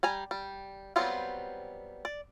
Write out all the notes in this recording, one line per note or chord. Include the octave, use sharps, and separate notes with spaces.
G3 G#5 A#5
G3
F#3 G3 B3 C4 F4
D5